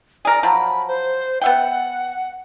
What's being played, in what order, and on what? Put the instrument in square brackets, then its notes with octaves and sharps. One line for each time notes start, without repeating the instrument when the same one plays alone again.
[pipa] G#4 A#4 [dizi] D5
[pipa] F3 F#3 [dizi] B5
[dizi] C5
[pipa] B3 E5 G5 [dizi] F#5